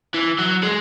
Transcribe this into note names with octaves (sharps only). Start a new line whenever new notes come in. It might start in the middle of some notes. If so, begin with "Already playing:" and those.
E3
F#3
G#3